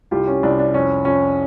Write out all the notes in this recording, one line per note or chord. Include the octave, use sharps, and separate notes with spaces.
C2 F4 G4
C#4
C2 D4
D4
F2 C#4
F2 C#4